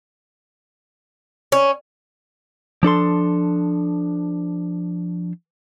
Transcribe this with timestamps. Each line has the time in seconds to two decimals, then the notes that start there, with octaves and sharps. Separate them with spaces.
1.52 C#4
2.83 F3 D4 A4 C6